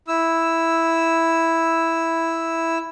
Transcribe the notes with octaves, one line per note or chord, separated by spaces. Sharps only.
E4 E6